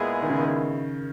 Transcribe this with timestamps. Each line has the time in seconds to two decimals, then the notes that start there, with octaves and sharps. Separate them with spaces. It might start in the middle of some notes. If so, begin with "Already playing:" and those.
Already playing: A#2 G#3 B3 E4 G#4
0.22 D#3
0.30 C#3
0.39 D#3